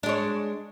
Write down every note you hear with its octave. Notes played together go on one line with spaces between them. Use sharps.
G#3 D4 C#5